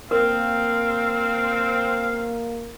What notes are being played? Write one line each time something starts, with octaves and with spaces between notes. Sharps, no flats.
A#3 C4 A#4 F5